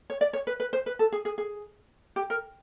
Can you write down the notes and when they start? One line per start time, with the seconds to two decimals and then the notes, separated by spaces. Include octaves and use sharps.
0.10 C#5
0.21 D5
0.33 C#5
0.47 B4
0.60 B4
0.73 C5
0.86 B4
0.99 A4
1.12 G#4
1.25 G#4
1.38 G#4
2.16 G4
2.30 A#4